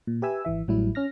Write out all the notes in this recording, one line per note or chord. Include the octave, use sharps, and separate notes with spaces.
A#2
G4 B4 E5 G#5 E6
G#1 E3 E5
A1 A2 F#3 G3 E4
C#4 F6 A#6